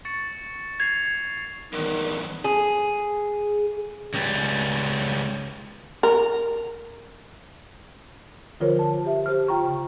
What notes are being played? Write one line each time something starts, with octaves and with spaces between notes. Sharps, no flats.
C#6 A6 C#7
G#6 C7 F7
E2 G2 D#3
G#4
C#2 G3
A#4
D3 F3 F4 A#4 C5 C#5
A5
G4 E5
G4 C5 F6
F4 G5 A#5 C#6
C#3